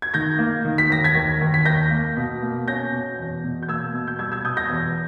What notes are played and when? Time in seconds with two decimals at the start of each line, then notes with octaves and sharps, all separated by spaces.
0.02 G#6
0.14 D#3 G6 A#6
0.39 A#3
0.65 D#3
0.78 B6
0.90 D#2 A#6
1.04 G#6 B6
1.15 D#2
1.41 D#2
1.54 B6
1.65 D#2 G6 A#6
1.91 A#3
2.17 B2
2.43 A#3
2.68 C#4 G6 A#6
2.92 B2
3.19 E2
3.44 B2
3.63 G6
3.68 A#3 E6 G#6
3.94 B2
4.08 G6
4.19 G3 E6 G#6
4.32 E6 G#6
4.45 B2 D#6 G6
4.57 G6 A#6
4.70 E2